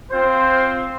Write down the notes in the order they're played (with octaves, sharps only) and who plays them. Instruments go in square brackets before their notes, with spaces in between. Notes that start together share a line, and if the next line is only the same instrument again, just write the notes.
[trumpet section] C4 F4 C5